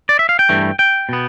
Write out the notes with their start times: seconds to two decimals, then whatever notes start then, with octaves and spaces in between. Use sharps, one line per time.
0.09 D5
0.19 E5
0.29 F5
0.39 G5
0.49 G2 E3 A3
0.79 G5
1.09 B2 B3